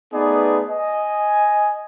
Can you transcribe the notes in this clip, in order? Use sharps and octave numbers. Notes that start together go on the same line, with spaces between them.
A3 B3 D#4 G#4 B4 D5
D#5 G#5